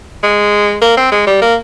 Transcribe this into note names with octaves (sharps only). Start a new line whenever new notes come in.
G#3
A#3
C4
G#3
G3
A#3